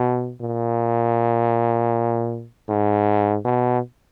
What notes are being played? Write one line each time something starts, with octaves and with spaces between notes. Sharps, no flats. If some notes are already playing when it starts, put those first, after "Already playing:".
Already playing: B2
A#2
G#2
B2